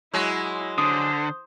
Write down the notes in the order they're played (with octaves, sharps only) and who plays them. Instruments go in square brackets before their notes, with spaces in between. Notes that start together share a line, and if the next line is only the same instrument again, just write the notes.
[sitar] F#3 G#3 F#4 [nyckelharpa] E4
[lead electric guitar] D3 [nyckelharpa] C5 [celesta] D#6